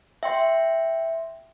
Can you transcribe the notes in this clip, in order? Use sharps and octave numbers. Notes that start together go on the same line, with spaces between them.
E5 G5 C6